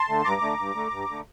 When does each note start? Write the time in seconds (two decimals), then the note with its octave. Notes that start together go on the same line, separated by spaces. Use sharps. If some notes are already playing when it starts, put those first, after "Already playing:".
Already playing: A5 C6
0.09 D3 A3
0.24 G2 A#5 D6
0.41 D3 A3
0.58 G2
0.75 D3 A3
0.91 G2
1.08 D3 A3